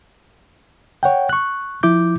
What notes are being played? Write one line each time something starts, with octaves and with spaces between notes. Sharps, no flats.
C#5 F#5 G5
C#6 F#6
F3 E4 D6 G6